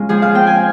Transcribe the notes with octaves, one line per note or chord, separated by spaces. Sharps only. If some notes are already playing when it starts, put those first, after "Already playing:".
Already playing: G#3 C#4 F4
F3 G#4
F5
C4 G5
G#5